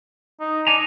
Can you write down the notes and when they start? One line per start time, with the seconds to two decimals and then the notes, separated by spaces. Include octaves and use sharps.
0.40 D#4
0.67 D4 D#4 G#5 A#5